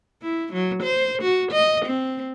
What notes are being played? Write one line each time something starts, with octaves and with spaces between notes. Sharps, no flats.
E4
F#3
C5
F#4
D#5
C4